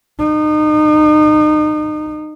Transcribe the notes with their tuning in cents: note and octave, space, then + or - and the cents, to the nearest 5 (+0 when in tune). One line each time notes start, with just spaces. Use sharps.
D#4 -30